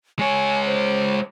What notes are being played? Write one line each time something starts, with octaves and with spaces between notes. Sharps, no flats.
G#3 C#5 G#5
C5